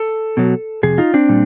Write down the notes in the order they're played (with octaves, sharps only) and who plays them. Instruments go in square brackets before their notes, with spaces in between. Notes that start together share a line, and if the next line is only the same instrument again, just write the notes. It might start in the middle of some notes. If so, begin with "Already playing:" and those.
Already playing: [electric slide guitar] A4
B2 F#3
F2 C3 G#4
D#4 F4
C4 D4
A#2 G3